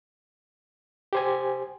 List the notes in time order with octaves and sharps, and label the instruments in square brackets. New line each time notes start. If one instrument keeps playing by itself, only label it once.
[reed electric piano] G4 C5 G#5